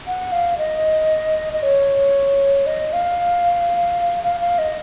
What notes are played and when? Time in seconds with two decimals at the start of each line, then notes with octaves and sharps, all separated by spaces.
0.07 F#5
0.32 F5
0.58 D#5
1.53 D#5
1.63 C#5
2.66 D#5
2.93 F5
4.23 F5
4.40 F5
4.59 D#5